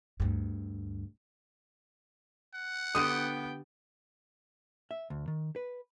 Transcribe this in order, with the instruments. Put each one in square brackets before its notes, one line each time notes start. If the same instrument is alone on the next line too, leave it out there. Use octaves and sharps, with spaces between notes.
[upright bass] D2 G2
[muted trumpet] F#5
[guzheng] D3 G4 D5 [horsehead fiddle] B3 G5 [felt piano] D#6 D#7
[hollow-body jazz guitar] E5
D2
D#3
B4